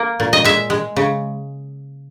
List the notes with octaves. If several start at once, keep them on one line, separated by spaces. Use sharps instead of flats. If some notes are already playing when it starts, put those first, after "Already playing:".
Already playing: A#3
A#2
D#5
G#3 E5
G#3
C#3